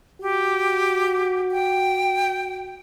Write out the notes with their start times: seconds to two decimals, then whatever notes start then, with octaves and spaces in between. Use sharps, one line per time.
0.21 F#4 G4
1.51 G5